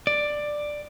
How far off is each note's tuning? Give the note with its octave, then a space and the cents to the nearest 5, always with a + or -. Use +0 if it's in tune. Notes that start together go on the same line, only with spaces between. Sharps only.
D5 +10